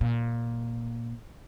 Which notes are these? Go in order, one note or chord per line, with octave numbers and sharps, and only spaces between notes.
A#2